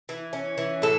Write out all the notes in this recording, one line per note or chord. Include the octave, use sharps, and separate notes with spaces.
E3
C#4
E3
A2 A4